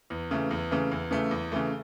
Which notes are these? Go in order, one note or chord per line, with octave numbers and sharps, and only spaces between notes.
E2
C#3 E3 A3
E2
C#3 E3 A3
E2
C#3 E3 A3
E2
C#3 E3 A3